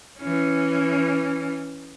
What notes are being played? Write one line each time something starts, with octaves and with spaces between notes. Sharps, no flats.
E3 C#4